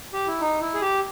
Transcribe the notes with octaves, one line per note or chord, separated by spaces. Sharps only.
G4
E4
D#4
E4
G#4
G4